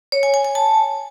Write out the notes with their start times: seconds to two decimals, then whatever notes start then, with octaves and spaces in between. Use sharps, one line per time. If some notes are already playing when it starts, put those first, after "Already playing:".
0.12 C#5
0.23 G#5
0.34 G#5
0.45 G#5
0.55 A5